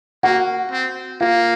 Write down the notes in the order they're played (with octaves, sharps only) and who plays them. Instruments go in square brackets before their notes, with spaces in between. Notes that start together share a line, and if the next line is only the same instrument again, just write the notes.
[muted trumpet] A#3 [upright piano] F#4 F#5
[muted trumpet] C4
[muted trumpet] A#3 [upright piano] F4 F5